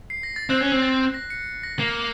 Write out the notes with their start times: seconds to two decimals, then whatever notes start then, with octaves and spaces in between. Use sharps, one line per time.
0.10 C7
0.23 A#6
0.36 A6
0.50 C4 F#6
0.61 C#4
0.72 C4
0.82 A6
1.14 A#6
1.30 C#7
1.63 A#6
1.79 A#3 C7